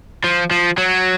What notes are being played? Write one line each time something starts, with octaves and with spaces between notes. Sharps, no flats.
F3
F3
F#3